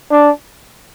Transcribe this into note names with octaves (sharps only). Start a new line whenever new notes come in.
D4